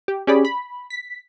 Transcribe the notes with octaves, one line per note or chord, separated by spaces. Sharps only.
G4
C#4 G4 G#4 D5 B5
B5
B6